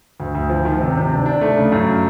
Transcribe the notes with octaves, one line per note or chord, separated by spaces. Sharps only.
D2
D2
F3
D#3
C3
C3
D4
D4
A3
C#3
F#2